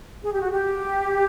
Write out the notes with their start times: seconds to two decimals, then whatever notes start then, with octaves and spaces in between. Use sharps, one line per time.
0.24 G#4
0.32 G4
0.41 F#4
0.51 G4